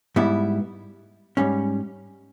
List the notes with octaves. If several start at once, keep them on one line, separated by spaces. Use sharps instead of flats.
G#2 G3 B3 E4
G#2 G3 C#4